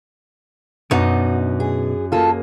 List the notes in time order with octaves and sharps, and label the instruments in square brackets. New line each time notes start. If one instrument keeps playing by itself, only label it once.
[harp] F#2 D4 [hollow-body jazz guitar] B2 B3 D#4 [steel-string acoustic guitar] F#4
[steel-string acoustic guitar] G#4
[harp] A#3 G#4 [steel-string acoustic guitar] F4 A4